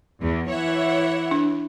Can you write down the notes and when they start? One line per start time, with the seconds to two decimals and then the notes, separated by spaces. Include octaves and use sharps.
0.21 E2
0.50 E3 C#5 E5 F#5
1.31 D4